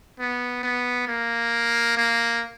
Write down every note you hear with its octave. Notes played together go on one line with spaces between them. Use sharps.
B3
B3
A#3
A#3